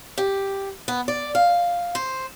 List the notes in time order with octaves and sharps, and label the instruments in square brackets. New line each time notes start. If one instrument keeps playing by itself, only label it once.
[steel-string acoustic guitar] G4
B3
D5
F5
C5